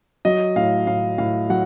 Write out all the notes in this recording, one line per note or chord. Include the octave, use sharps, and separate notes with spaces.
F#3 D#5
A2 F5
A2 F5
A2 F5
F#3 F#5